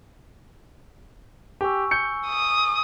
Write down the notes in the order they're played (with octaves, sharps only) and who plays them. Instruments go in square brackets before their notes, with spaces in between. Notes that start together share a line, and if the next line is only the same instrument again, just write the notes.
[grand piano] G4 [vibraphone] G#5 C#6 E6
[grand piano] G6 C#7
[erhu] D#6